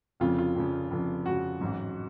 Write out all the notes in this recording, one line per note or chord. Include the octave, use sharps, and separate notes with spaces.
F1 F2 C#3 F4
F4
F1 F2 C#3
F1 F2 C#3
F1 F2 C#3 F#4
A1 G#2 F#3